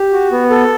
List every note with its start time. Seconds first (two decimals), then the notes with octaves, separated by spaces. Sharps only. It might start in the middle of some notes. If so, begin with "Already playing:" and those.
Already playing: G4
0.12 F#4
0.32 B3
0.50 A4